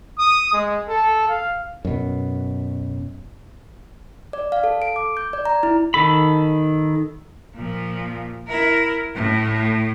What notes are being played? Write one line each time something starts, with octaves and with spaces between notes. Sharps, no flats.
D#6
G#3
A4
F5
F#2 B2
D5
F5
A4
D7
D6
G6
D5
A#5
E4
D#3 A4 B5
A#2 F3
E4 A#4
A2